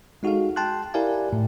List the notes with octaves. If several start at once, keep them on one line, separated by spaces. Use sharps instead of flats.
G#3 D#4 F#4 G#4 A4 F5
G5 A5 C6 F#6
E4 G4 A#4 D5 F5 G#5
A2